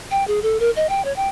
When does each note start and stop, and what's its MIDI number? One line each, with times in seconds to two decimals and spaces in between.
0.11 0.26 79
0.28 0.40 68
0.43 0.58 69
0.60 0.71 70
0.76 0.87 75
0.89 1.04 79
1.05 1.15 73
1.16 1.28 79